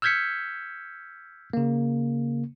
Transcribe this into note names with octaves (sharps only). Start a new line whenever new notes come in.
E6 F6 G6 G#6 B6 C#7
C#3 A#3